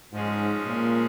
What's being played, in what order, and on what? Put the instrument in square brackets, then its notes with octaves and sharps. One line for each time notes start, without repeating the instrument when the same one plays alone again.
[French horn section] G#2 [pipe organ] F3 G#3 C#4 G#4
[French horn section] A#2